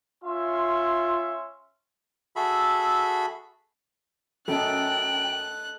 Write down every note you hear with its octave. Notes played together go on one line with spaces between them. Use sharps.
C#4 F4 E5 C6
F#4 G#4 A4 E5 B5
F#2 A4 D#5 G5 F#6